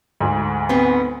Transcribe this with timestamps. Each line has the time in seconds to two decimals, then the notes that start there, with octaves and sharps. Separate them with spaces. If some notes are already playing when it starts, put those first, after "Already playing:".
0.20 D2 G#2
0.69 B3 C4